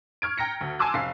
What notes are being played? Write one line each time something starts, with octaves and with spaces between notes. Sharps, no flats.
C#6 F6 G#6 D7
G5 A#5 A#6 C#7
D2
G#5 A5 C6 D6 E6 F#6
F1 F5 C7